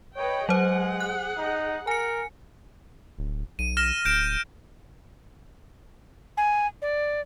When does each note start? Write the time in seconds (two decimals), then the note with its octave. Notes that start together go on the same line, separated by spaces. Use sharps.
0.16 B4 C#5 D#5 G5
0.49 F#3 G#3 G#4 C5 F#5
1.00 F#6
1.38 D#4
1.87 A#4 G#5 C#7
3.19 D1
3.59 B1 D#7
3.77 F6 A#6 E7
4.05 D1 G6 D7 E7
6.37 G#5
6.82 D5